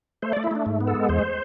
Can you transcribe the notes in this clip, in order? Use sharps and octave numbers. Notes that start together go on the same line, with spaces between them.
A3 C5
A3 D5
E4
A3 D4
G#2
B3
A4
G#3
E2 C5